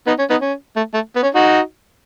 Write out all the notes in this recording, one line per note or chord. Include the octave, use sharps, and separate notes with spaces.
B3 D#4
C#4
B3 D#4
C#4
A3
A3
B3
C#4
D#4 F#4